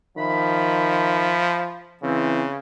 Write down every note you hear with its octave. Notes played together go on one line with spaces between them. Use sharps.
D#3 F3 E5 B5
C#3 E3 C4